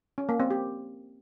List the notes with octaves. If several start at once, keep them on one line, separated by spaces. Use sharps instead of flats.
C#4
A#3
C4
G4